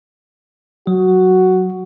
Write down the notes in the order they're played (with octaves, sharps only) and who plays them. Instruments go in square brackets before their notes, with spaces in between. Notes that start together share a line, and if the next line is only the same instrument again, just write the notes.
[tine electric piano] F#3 [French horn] F#4